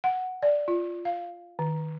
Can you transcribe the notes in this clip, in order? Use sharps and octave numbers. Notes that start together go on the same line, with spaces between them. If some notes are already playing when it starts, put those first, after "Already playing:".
F#5
D5
F4
F5
D#3